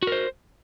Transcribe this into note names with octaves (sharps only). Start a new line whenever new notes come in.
F#4 A#4 C5